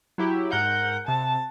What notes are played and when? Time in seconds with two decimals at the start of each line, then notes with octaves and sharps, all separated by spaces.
0.18 F#3 E4 G4
0.52 G#2 A#4 F#5 G6
1.08 C3 A5